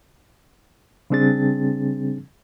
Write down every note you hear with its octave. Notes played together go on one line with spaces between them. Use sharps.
C#3 G3 C4 D4 G#4 A6